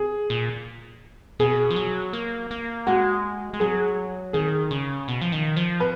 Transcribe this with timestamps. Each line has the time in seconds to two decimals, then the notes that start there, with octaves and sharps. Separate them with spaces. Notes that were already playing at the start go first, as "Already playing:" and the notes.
Already playing: G#4
0.30 A#2
1.39 B2 G#4
1.70 F3
1.76 F#3
2.13 A#3
2.51 A#3
2.87 G#3 F#4
3.54 G#3
3.60 F#3 G#4
4.33 D#3 G#4
4.71 C#3
5.08 B2
5.22 F3
5.32 D#3
5.56 F3
5.80 B4